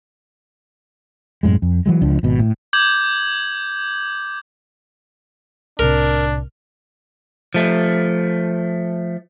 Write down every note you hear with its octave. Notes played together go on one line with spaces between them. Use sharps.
F#2 A2 G#3
F2
E3 F#3 G#3
C#2 F3 D4
G#1 B2
A2
D6 G6 G#6 F#7
C2 A2 C3 D4 A#4
F3 A3